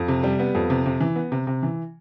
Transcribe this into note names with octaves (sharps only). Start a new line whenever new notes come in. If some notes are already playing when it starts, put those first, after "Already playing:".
Already playing: F2
C3
G3
B3
F2
C3
C3
E3
B3
C3
C3
E3